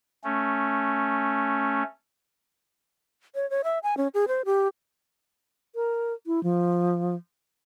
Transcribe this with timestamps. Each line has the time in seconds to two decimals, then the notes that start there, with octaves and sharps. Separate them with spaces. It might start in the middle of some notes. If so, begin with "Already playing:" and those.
0.24 A3 C#4
3.35 C#5
3.50 C#5
3.64 E5
3.83 G#5
3.97 C#4
4.14 G#4
4.28 C5
4.45 G4
5.75 A#4
6.27 E4
6.43 F3